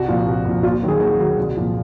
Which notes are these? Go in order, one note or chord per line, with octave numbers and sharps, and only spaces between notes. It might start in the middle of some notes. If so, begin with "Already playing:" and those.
Already playing: C2 F#4
A#2 F3
C2
A#2 F3
D#2 F4
D#3 F#3
G#4
D#2 F#4
D#3 F#3 F#4
C2
A#2 F3